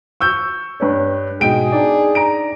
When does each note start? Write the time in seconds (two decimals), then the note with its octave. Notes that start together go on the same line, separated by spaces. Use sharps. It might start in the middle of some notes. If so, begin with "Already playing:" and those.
0.21 C#6 E6 G6
0.80 G2 B4 C#5
1.41 G#2 B2 G#4 D#5 G5 D7
1.72 D4 D#4 D5
2.15 A#5 D7